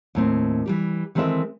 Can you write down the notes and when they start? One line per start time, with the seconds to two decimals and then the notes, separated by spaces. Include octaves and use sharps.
0.15 D#2 A2 C4
0.66 E3 G3 G4
1.15 D#3 E3 G#3 C4 A4 E5